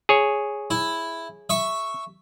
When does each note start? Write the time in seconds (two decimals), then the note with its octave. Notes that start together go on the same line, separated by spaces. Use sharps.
0.09 G#4 C#5
0.70 E4
1.50 E5 C#6